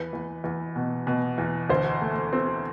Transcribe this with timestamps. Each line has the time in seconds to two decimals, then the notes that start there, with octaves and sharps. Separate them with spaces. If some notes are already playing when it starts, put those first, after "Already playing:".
Already playing: E2 B4
0.13 E2
0.44 E2
0.76 B2
1.07 B2
1.38 E2
1.70 D2 C5
2.02 A3
2.33 C4